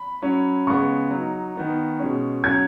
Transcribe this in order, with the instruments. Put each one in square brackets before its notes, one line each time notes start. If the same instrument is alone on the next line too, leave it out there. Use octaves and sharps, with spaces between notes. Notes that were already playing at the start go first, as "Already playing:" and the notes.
Already playing: [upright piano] B5
[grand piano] F#3 C#4
[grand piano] C#3 G#3 B3 [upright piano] C#6
[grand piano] F#3 D#4
D#3 B3 D#4
B2 G#3 C#4
[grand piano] F#3 C#4 [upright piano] G#6